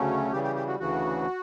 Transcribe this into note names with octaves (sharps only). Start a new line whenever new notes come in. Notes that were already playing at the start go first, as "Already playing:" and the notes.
Already playing: D2 C#3 F#3 A3 C#4
C#3 E3 G3 G4
G4
G4
F#4
D2 C#3 E3 F#4